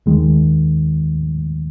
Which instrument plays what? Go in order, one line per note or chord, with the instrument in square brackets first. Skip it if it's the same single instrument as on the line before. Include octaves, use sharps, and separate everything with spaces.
[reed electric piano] D#2 D#3 G#3